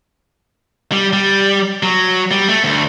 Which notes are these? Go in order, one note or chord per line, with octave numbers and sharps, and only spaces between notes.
G3
G3
F#3
G3
A3
D2